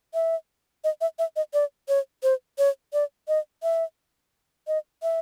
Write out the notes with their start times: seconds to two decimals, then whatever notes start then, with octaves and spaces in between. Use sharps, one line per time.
0.14 E5
0.84 D#5
1.01 E5
1.19 E5
1.36 D#5
1.54 D5
1.88 C#5
2.23 C5
2.58 C#5
2.93 D5
3.28 D#5
3.63 E5
4.67 D#5
5.03 E5